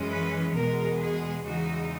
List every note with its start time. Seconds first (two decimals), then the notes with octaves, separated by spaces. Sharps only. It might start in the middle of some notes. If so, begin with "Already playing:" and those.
Already playing: F#2 E3 G#3 C#4
0.09 B4
0.54 E2 B2 G#3 B3 A#4
0.99 G#4
1.44 E2 C#3 E3 G#3 D#4 F#4